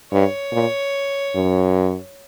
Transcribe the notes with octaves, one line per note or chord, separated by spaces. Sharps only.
G2 C#5
A#2
F#2